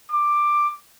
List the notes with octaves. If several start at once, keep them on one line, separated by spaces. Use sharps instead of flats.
D6